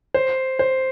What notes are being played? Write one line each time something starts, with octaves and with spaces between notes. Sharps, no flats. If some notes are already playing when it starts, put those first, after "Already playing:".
C5
C5